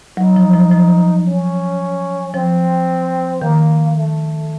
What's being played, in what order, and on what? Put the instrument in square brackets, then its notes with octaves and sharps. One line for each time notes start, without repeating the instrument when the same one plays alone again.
[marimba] F#3 [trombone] D#4
[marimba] F3
F3
F3
[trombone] C#4
[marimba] F3 [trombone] C4
[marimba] D#3 [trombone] A#3
[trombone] A3